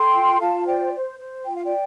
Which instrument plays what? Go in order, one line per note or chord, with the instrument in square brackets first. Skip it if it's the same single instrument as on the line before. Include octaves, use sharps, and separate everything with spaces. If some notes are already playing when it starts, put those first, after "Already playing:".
Already playing: [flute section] A4 G5 C6
F4
F4 F5 A5
C5 D5 G5
C5
C5
F4 G5
F5
D5 G5